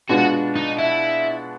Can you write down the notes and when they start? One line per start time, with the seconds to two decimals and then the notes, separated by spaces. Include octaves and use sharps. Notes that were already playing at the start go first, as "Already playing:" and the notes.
0.10 B2 G#3 B3 D4 F4 F#4
0.56 D#4
0.79 E4